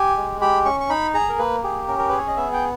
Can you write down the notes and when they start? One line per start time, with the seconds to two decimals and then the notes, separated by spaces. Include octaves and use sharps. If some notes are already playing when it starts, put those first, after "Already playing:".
Already playing: G4 G#5
0.16 G#3
0.41 G4 B5
0.65 C#4 C#6
0.80 C#6
0.90 D#4 B5
1.14 G#4 A#5
1.29 A#4
1.39 A#3 B4
1.64 G4 G#4
1.88 C#4 A#4
1.98 A#4
2.09 G#4 B4
2.18 C#5
2.28 D#5
2.36 B3 E5
2.53 G5